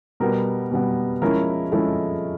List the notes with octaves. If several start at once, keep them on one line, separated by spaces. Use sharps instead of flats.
B2 G3 B3 A#4
B2 G3 B3
F3 G#3 C#4 E4 A#4
F3 G#3 C#4 E4 A4